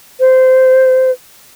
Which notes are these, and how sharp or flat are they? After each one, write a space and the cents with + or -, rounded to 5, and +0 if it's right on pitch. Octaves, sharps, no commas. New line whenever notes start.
C5 -15